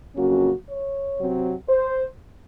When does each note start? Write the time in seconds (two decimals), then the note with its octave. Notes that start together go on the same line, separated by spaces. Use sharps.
0.16 F2 C#3 F#3 A#3 C#4 F#4
0.68 C#5
1.18 C3 F#3 C4
1.69 C5